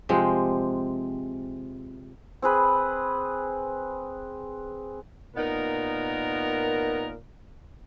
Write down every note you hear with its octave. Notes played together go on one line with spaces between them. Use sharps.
C3 F3 G#3 C4
C4 G#4 B4
A#2 B3 D#4 A#4